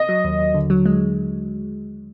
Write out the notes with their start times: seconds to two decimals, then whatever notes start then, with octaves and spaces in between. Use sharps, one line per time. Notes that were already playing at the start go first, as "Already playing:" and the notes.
Already playing: D#5
0.09 F#3
0.24 D#2
0.39 D#2
0.54 D3
0.70 F#3
0.85 G#3